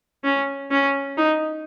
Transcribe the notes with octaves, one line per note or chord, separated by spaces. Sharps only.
C#4
C#4
D#4